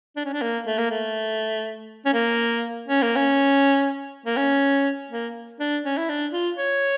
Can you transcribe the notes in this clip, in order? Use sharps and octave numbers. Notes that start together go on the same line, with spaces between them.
D4
C#4
D4
A#3
A3
A#3
A3
C#4
A#3
C#4
A#3
C#4
A#3
C#4
A#3
D4
C#4
E4
D4
F4
C#5